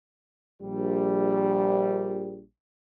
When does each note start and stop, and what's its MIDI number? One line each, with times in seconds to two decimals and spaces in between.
0.62 2.42 34
0.62 2.42 55